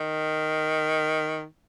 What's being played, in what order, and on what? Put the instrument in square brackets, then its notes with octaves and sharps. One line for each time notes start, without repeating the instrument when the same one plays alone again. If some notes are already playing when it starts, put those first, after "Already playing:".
Already playing: [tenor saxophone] D#3